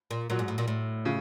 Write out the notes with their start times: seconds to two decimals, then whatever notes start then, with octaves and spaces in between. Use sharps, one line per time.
0.11 A#2
0.30 A#2 F#3
0.39 G#2
0.48 A2
0.58 A#2
0.68 A2
1.05 C#3